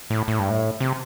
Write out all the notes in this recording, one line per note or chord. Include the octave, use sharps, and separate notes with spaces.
A2
A2
G2
A2
C3